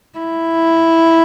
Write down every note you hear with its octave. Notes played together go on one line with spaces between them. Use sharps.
E4